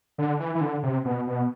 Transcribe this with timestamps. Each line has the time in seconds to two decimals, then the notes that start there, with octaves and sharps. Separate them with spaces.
0.18 D3
0.40 E3
0.55 E3
0.61 D3
0.83 C3
1.05 B2
1.27 B2